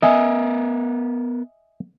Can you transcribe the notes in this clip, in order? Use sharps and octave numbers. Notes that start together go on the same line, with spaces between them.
B3 A#4 D#5 E5 G#5